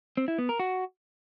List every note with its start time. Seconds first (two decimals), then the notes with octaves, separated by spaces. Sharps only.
0.17 C4
0.28 E4
0.38 B3
0.49 A#4
0.59 F#4